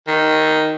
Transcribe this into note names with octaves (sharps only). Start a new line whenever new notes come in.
D#3